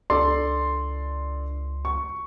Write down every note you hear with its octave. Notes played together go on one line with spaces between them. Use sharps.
C#2 D4 A4 D5 C6
C#6